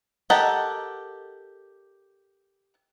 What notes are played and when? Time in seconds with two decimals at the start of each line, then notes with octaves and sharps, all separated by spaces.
0.30 G4 A4 A#4 D#5 F#5